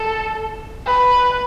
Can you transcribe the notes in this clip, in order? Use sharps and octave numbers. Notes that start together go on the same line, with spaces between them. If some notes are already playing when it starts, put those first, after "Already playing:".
Already playing: A4
B4